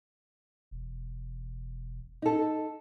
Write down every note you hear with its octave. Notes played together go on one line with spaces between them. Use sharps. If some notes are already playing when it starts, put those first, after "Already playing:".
E1
D#4 A4